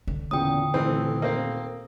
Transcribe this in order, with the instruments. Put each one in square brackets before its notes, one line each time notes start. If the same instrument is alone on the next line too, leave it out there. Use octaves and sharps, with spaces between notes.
[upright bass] D3
[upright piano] E2 A#2 C#3 [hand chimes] G5 D#6
[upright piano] D#1 A3 [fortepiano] E3 C4
[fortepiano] A#3 C4